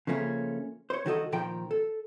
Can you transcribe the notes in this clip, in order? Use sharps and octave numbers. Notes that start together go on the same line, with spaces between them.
C#3 F3 A3 A#3 C#4
C5 C#5
C2 D#3 F#4 A4 D#5
A#2 D#3 F3 A#4 G5
A4